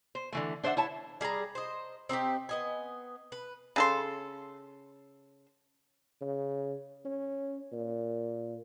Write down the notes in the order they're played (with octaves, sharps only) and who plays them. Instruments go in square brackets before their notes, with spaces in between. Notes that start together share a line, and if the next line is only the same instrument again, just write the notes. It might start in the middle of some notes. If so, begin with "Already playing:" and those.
[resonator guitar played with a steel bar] C5
D3 E3 A3
D4 C5 C#5 E5 F#5
E4 C#5 A5
[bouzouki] G3 G#4 G#5 A#5
C5 D#5
C4 D#4 F#4 G4
B3 D#5 G#5
B4
[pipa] C#3 A4 C6
[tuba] C#3
C#4
A#2